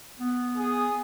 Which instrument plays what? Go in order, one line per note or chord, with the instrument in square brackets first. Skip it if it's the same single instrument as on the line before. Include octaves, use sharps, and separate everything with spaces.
[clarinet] B3
[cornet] G#4